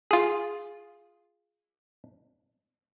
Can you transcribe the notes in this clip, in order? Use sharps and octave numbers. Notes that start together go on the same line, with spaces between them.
F4 G#4